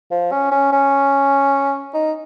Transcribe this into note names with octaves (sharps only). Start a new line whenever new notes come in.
F3
C#4
C#4
C#4
D#4